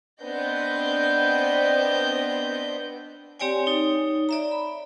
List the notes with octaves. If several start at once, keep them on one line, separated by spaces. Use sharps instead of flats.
B3 C4 D4 D#5 G5 G6
C4 G4 C#5 D5 G5 G#5
D#4 C#5
D5 E5 A#5
B5